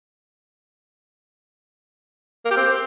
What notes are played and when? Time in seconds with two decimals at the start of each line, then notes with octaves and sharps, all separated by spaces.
2.45 A#3
2.51 G4
2.57 C4